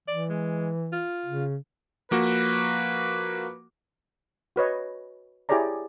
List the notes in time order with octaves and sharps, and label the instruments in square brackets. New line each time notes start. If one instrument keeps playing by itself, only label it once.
[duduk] E3 [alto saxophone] D5
[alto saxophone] G#3
F4
[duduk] C#3
[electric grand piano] F3 A#3 F#4 [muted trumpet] B4
[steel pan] F#4 B4 C#5 D#5
E4 G4 G#4 C#5 D5 A#5